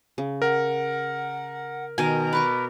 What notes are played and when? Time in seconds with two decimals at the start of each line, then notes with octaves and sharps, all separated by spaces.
0.18 C#3
0.42 A#4 F#5
1.98 B2 D#3 A#4 G#5
2.33 B4 D5 C#6 D6